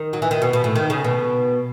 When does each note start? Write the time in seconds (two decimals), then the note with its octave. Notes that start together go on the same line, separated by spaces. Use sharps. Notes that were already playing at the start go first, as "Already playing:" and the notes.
Already playing: D#3
0.13 F#3
0.22 E3
0.31 D#3
0.42 B2
0.53 B2
0.64 A2
0.75 D#3
0.90 C#3
1.04 B2